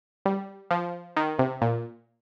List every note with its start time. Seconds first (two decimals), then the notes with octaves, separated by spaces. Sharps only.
0.26 G3
0.71 F3
1.16 D#3
1.39 C3
1.62 A#2